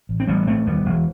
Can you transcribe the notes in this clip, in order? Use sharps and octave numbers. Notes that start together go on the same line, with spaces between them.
A1
C4
A1 G3 B3
A1 A3 C4
D#2 G3 B3
E1